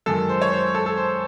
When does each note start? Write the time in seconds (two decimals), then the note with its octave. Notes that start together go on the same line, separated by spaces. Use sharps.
0.06 F#2 D#3 G#3 A4
0.29 C5
0.41 C#5
0.52 C5
0.74 A4
0.86 A4
0.97 C5